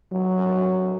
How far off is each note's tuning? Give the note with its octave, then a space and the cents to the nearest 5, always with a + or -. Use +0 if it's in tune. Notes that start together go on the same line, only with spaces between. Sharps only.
F#3 +0